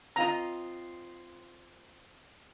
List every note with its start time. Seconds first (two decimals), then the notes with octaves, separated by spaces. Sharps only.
0.16 C4 F4 D#5 A#5